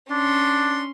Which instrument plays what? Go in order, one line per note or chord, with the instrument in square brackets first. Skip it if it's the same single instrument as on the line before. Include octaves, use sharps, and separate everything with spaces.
[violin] C#4 C6 [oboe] D4